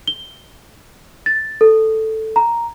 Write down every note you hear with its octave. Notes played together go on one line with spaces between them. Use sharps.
G7
A6
A4
A#5